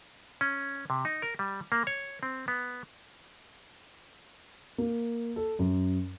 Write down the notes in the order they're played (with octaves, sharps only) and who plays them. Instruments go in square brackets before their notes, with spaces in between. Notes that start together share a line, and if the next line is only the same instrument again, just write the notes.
[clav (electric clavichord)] C#4
C3
D#4
A#4
G3
A#3
C#5
C4
B3
[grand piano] A#3
A4
F#2